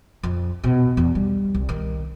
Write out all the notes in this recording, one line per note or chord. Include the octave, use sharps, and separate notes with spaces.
F2
B2
E2
G3
C2
D#3